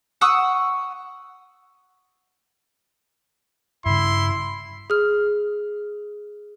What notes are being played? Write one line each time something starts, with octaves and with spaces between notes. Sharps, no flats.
F#5 C#6 D#6 E6
G2 C#3 E4 C6
G#4 F6